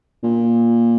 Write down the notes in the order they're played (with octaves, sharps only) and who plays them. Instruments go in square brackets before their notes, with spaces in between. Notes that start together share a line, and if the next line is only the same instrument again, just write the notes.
[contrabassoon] A#2